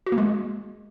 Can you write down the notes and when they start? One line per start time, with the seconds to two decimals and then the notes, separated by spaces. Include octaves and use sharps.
0.06 F#4
0.12 A#3
0.18 G#3